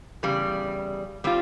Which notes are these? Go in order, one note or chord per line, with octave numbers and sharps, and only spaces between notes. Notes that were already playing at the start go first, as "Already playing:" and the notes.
E2 C#3 G3
G3 C4 F4